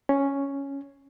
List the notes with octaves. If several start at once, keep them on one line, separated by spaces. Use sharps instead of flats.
C#4